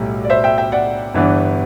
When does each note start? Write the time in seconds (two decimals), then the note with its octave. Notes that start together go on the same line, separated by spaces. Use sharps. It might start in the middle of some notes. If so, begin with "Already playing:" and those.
Already playing: B1 A2 G3
0.25 D5
0.30 C5 E5
0.44 E5 G5
0.58 E5 G5
0.72 D5 F#5
1.14 G1 G2 E3 B3 D4